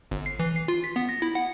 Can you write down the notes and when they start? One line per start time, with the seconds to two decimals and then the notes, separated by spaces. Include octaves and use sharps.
0.11 G1
0.26 C7
0.39 E3
0.55 C7
0.68 F4
0.84 B6
0.96 B3
1.09 A#6
1.22 E4
1.35 F#5